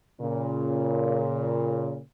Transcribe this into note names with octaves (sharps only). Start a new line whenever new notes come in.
A#2 C#3